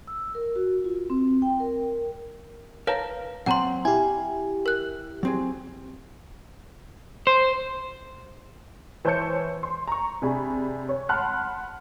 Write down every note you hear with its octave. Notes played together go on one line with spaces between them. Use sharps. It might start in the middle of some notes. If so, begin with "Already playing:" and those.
E6
A#4
F#4
F4
C4
G5
A#4
A#4 B4 C#5 F5 A5 A#5
A#2 F#3 C4 F#5 A#5 C6
E4 G4 F5 G#5
A#4 F#6
F#3 C4 G#4
C5
E3 C5 C#5 A5 G6 C#7
C6
A#5 C#6
C3 D4 G#4 B5
C#5
F#5 A5 B5 C6 F6 F#6